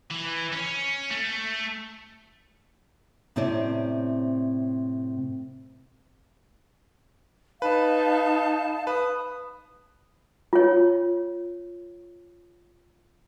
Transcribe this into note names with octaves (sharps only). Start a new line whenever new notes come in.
E3
C#4
A3
A2 C3 C4 C#4 E4 D5
D#4 B4 F5 A5
B4 D#6
F4 C#5